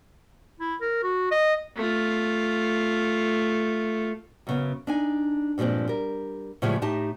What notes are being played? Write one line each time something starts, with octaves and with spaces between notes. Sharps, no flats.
E4
A#4
F#4
D#5
A3 F4
F#2 C#3 B3
D4 D#4 G#5
G2 A#2 F3 G#3 C4
G3 A#4
A2 C#3 E3 F3 G3 G#3
A2 D#4 G4 A5